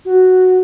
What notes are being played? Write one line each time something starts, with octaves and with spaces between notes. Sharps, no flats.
F#4